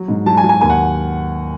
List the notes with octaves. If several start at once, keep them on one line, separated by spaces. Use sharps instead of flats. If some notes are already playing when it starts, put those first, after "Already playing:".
Already playing: F#3
G#2
F#3 A5
G#5
F#3
G#5
D#2 G#5
F#5